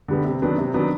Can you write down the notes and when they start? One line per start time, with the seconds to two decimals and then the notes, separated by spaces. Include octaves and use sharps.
0.08 D3 G3 B3
0.25 C3
0.42 D#3 F#3 B3 D4
0.58 C3
0.74 D#3 F#3 B3 D4